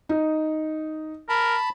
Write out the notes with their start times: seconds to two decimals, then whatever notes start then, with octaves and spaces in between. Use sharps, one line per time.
0.09 D#4
1.29 A#4 A5 B5